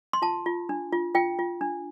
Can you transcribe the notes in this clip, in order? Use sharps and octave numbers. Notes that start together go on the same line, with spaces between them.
C6
F4 A5
F4
D4
F4
F4 G5
F4
D4